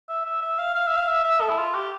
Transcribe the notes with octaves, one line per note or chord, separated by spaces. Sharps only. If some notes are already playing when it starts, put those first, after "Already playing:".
E5
E5
E5
F5
F5
E5
F5
E5
E5
A4
E4
F4
G4